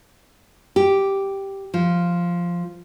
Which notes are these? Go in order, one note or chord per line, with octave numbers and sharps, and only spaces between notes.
G4
F3